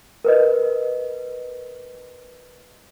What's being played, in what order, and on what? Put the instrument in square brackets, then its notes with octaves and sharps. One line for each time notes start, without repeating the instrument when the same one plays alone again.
[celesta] A#4 B4 D#5